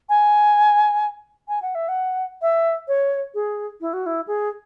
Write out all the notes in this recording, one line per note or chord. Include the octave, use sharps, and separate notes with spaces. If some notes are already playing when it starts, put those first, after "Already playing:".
G#5
G#5
F#5
E5
F#5
E5
C#5
G#4
E4
F#4
E4
G#4